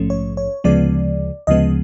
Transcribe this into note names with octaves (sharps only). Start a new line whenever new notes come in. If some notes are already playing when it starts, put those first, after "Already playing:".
Already playing: A#1 G#2 F3 A3 C#4
C#5
C#5
D2 C#3 F3 G#3 B3 D5
D2 C#3 F3 G#3 B3 D#5